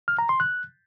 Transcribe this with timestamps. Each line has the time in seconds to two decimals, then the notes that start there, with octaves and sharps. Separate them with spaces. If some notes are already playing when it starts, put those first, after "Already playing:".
0.08 F6
0.19 A#5
0.29 C6
0.40 F#6